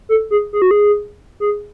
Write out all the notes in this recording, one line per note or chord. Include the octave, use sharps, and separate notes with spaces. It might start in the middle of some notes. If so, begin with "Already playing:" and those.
A4
G#4
G#4
F#4
G#4
G#4